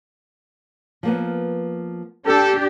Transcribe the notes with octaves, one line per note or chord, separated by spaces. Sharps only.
F3 A#3 B3
D4 G4 A4